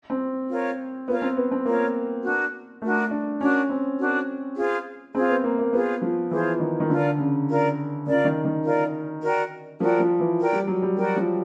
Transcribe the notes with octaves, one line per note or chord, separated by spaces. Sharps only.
C4
F4 A#4 C#5
B3 F4 A#4 C#5
C4
B3
C4
A#3 F4 A#4 C#5
D4 F#4 A#4
A3 D4 F#4 A#4
D4
C#4 D4 F#4 A#4
C4
D4 F#4 A#4
F4 G#4 C5
C4 F4 G#4 C5
B3
A#3
A#3
B3 F4 G#4 C5
F3
E3 F4 G#4 C5
D#3
D#3
D3 F4 A#4 D5
C#3
F4 A#4 D5
C#3 F4 A#4 D5
D#3
D#3
F4 A#4 D5
F#4 A#4 D5 G5
F3 F#4 A#4 D5 G5
F3
E3
F#4 A#4 D5 G5
G3
F#3
G3
F#3 F#4 A#4 D5 G5
F3